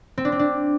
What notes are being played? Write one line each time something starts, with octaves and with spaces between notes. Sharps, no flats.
C4
D4
C4
D4